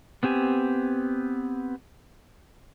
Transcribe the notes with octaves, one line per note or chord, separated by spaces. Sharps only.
B3 C4 G4 G#5